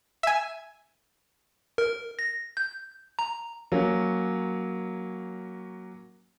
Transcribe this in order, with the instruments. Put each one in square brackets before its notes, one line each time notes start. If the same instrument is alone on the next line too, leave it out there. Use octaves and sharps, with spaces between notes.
[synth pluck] E5 G#5
[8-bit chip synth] A#4
A#6
G6
A#5
[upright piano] F#3 A#3 C#4